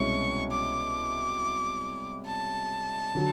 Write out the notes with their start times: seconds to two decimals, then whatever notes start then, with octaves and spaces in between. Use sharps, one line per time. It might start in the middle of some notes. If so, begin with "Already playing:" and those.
Already playing: C2 B2 G#3 C#4 E4 C#6
0.52 D6
2.27 A5
3.15 D3 F#3